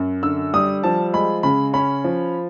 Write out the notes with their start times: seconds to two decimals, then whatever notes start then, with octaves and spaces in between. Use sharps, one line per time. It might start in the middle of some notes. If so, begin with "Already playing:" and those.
Already playing: F#2
0.23 D3 E6
0.54 G3 D#6
0.83 F3 A5
1.13 G#3 B5
1.43 C#3 B5
1.73 C#4 B5
2.04 F3